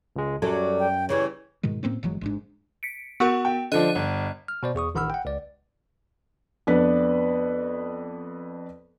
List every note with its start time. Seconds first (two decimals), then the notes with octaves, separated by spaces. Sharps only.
0.16 C#2 G#3
0.42 F#2 F#3 G3 A4
0.79 G5
1.09 C#3 E3 G3 C#5
1.63 G#2 B2 D#3 G#3
1.83 A2 A#3 C4 C#4
2.03 G1 E3 F#3 G#3
2.21 G#1 G#2 D4
2.83 B6 C#7 D7
3.20 B3 F#4 A#4 F#5 C#6
3.45 G5
3.72 D3 F3 D4 D#5 F#6 D#7
3.95 G1
4.48 F6
4.63 B2 C5 D5
4.75 E2 G#4 C#6 D#6
4.95 A1 D#3 F#5 B5 E6 F6
5.10 F#5 G5
5.25 C#2 D5
6.67 F2 B3 D4 B4 D5